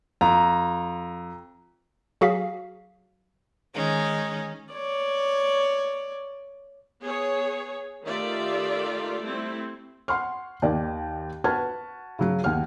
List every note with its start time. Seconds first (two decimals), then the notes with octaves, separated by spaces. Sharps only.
0.21 F2 A#5
2.21 F#3 F#4 G#4 F5 B6
3.76 D#3 G#3 C#4 D#4
4.73 C#5 D5
7.03 B3 G#4 C#5
8.05 D#3 A3 F4 G4 D5 E5
9.23 G3 A3 C4 E4
10.08 F#5 C6 C#6 F6
10.62 D#2 D#3 D5
11.44 F#4 B4 A5 F6 G#6
12.19 C#3 F#3
12.44 D#2 F#5 F6